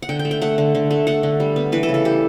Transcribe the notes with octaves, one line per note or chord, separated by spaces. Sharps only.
F#5
D3 G5
G5
A3
G5
A3 F#5
D3
D3
A3
A3 F#5
D3
G3
B3
E3 B4
A4
C#3
A4
G3 G4